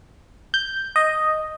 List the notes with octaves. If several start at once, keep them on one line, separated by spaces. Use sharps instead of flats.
G6
D#5